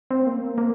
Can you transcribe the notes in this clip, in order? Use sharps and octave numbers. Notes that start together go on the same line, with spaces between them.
C4
A#3
A#3